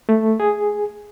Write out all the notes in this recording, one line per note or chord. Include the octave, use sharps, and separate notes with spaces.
A3
G#4